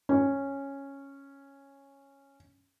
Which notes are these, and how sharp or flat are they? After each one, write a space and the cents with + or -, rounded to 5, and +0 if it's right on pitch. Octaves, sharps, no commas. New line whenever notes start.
C#4 -5